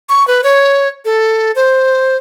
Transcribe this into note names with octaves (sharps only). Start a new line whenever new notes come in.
C#6
B4
C#5
A4
C5